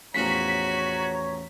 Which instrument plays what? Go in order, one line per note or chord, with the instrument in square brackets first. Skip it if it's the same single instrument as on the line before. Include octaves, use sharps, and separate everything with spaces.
[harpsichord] A1 E2 F3 [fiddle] F#4 [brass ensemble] C#5 A#5 [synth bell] B6